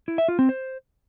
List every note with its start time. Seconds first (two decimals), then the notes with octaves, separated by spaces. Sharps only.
0.08 E4
0.18 E5
0.28 F4
0.39 C4
0.49 C5